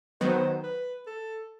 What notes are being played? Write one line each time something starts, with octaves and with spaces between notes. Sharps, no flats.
D#3 F#3 B3 C5
B4
A4